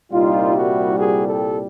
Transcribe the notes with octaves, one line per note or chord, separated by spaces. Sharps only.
C2 A#2 G3 D#4 F4
E4 F#4
F#4 G#4
G4 A4